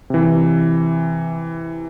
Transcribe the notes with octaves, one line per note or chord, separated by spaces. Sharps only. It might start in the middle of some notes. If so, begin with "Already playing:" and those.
C3 E3